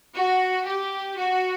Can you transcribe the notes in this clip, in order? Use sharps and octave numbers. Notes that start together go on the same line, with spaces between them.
F#4
G4
F#4